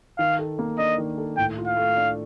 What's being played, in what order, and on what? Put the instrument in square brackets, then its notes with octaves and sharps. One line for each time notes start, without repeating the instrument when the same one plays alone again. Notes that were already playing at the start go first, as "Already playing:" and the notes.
[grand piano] D#3 [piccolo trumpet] F5
[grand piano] A4
A#3
[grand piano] D4 [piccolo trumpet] D#5
[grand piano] D#3
A4
[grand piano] A2 [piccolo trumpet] G5
[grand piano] F4
[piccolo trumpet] F5
[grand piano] A3
D4